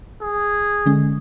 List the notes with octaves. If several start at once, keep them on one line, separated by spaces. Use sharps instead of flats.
G#4
D3 G#3 C#4